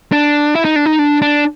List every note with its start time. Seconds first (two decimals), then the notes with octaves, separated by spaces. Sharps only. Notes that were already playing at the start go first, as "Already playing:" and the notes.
0.12 D4
0.55 E4
0.65 D#4
0.76 D4
0.86 D#4
0.99 D4
1.22 D4